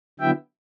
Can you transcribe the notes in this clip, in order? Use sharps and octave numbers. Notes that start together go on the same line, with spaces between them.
D3 F#3 B3 E4 E5 G5